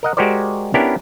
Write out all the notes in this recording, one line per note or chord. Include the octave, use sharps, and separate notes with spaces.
A#4 D#5 F#5
G#3 F#4 G4 A#4 C5 D5
B3 C#4 D4 E4 G4 A#4